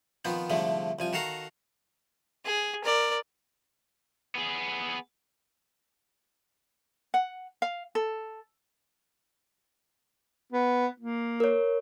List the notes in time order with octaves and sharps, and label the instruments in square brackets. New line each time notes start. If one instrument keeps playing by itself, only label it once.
[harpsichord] D#3 F3 B3 C4
C2 G#2 D3 F3 A3
C2 F3 G#5
D#3 F#4 A4 F5 A#5
[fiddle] G#4
A#4 D5
[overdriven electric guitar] B3 G#4
[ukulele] F#5
F5
A4
[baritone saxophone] B3
A#3
[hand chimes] A#4 C#5